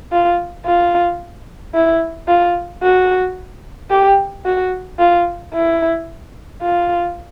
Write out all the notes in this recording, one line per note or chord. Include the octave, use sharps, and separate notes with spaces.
F4
F4
E4
F4
F#4
G4
F#4
F4
E4
F4